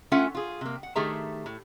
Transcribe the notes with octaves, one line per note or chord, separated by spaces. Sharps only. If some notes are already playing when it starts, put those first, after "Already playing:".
A3 C#4 F4 E5 F#5 G#5
F4 G#4
C3 A#3
F#5
D#3 A3 G4 G#4 E5 A#5
A2